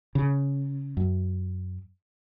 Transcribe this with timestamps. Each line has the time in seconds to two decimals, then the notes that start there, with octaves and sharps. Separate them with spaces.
0.15 C#3
0.97 F#2